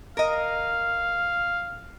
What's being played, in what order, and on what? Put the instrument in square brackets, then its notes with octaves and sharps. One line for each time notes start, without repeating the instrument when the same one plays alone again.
[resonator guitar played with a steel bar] A#4 D#5 [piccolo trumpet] F5